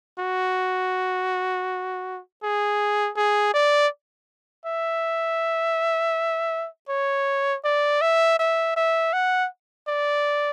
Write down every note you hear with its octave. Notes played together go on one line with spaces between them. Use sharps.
F#4
G#4
G#4
D5
E5
C#5
D5
E5
E5
E5
F#5
D5